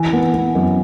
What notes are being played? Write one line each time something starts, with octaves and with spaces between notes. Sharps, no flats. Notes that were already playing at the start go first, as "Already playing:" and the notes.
Already playing: E3 G#5
B3
B3
F#2